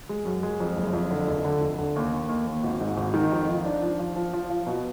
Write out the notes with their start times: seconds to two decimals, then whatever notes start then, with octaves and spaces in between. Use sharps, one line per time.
0.09 G#3
0.25 F#2
0.43 G#3
0.60 F2
0.76 F#1
0.93 F2
1.10 D3
1.28 F1
1.45 D3
1.61 F1
1.78 D3
1.96 D#2
2.13 D#2
2.29 D#2
2.47 D#2
2.63 G#1
2.81 G#2
2.97 G#1
3.14 D#3
3.32 F2
3.49 F3
3.65 D4
3.82 F3
3.99 F3
4.16 F3
4.33 F3
4.50 F3
4.67 B2